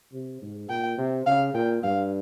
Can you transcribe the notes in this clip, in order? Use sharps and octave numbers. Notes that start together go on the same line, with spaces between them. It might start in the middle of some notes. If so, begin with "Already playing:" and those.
C3
G#2
A#2 G5
C3
C#3 F5
A#2 G5
G2 F5